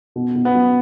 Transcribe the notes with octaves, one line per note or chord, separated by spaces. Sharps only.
B2
B2
B3
F#3